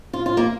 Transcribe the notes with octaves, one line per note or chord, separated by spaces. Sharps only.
F4
F4
A#3